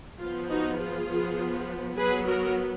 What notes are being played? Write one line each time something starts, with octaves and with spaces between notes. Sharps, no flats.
F3 B3 F4
D#4 F#4
F4 G#4
F3 B3
F#3 B3 G#4 B4
F#4 A#4